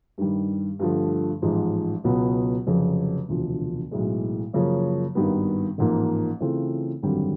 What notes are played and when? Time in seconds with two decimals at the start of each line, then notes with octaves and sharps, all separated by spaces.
0.18 G2 D#3 G3
0.79 G2 D3 F3 A3
1.42 A1 G#2 F3 G#3
2.04 C#2 B2 F#3 B3
2.67 F1 F2 C#3 F#3
3.29 E1 D2 C3 F3
3.91 B1 A2 E3 G#3
4.53 F#2 C#3 F3 A#3 C#4
5.15 G#1 G2 D#3 G3 B3
5.78 A1 G#2 F3 A#3
6.40 C#3 E3 A3 C4 F4
7.03 G#1 F#2 D3 G3 C4